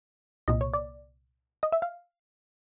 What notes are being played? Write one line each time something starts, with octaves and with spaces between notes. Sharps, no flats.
C2 A#2 D#5
C#5
D5
D#5
E5
F5